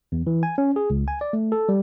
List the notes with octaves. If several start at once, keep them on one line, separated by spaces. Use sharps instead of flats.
E2
E3
G#5
C#4
G#4
C#2
G#5
D5
A3
A4
G3